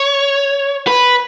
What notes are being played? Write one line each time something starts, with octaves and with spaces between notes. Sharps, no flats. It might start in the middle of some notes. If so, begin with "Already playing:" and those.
Already playing: C#5
B4